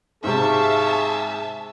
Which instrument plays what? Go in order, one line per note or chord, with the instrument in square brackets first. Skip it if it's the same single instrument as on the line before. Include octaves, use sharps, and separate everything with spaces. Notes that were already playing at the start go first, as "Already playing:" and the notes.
[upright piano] G#2 C3 [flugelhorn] G#4 [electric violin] E5 A5 [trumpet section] F5 C#6